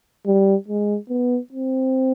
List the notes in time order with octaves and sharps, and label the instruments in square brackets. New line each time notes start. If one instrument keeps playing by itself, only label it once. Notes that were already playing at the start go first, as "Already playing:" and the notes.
[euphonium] G3
G#3
B3
C4